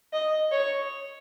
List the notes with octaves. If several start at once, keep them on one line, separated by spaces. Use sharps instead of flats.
D#5
C#5